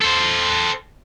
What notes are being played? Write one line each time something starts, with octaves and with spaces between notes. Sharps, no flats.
A4 C5